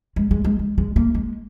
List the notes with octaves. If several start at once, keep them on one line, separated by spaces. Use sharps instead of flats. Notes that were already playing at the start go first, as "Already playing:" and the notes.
G#3
G#3
G#3
G#3
G#3
A#3
G#3